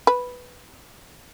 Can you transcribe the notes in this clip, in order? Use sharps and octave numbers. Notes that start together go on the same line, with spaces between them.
B4